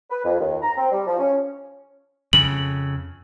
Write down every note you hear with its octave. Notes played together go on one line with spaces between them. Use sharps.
B4
F2
D#2
A#5
C4
G3
F3
C#4
F2 C#3 F#7